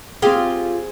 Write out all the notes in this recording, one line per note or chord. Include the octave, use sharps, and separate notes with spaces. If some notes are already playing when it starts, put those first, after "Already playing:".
C4 F4 G4 G#4